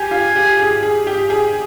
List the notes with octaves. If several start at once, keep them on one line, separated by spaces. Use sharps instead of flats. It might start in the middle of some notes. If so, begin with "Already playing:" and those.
Already playing: G4 G#5
F4
G4
G#4
G#4
G4
G#4